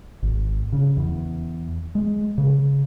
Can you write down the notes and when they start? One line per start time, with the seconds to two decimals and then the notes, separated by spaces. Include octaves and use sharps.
0.23 G#1
0.72 C#3
0.97 E2
1.95 G#3
2.38 C#3